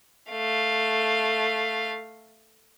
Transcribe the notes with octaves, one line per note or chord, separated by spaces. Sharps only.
A3 F5